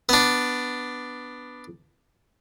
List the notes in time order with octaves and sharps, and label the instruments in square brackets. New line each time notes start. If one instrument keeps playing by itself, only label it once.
[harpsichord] B3 D4